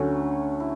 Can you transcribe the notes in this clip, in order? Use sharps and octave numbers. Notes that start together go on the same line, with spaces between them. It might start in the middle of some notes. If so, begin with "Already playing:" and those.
Already playing: D2 D3 F#3 A3 C#4 F#4
E4